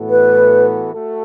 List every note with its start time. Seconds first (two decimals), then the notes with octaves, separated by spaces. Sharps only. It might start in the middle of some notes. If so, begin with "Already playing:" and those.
Already playing: A2 E3 B3 F#4 A4
0.09 B4
0.94 A3 F#4 A4